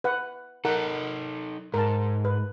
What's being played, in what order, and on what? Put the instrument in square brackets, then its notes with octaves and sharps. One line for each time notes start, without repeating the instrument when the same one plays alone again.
[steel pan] B4 F#5
[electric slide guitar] D#4 A4 [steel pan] A#4 F#5
[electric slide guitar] G#2 [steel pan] A#4 A5
[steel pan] B4